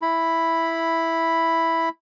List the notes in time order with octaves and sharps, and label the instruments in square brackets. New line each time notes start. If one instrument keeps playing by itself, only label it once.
[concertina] E4 B5